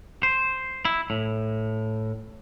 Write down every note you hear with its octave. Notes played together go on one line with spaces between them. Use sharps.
C5
E4
A2